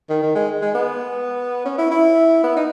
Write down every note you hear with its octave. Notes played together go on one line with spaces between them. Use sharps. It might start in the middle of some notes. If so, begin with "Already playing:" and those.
D#3
D#3
G#3
G#3
B3
C#4
E4
E4
B3
D#4